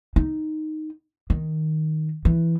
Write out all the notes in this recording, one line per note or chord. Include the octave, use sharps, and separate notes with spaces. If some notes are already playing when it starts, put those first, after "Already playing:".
D#4
D#3
E3